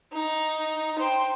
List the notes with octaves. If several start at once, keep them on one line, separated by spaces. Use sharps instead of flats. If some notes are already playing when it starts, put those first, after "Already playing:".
D#4
C5 G5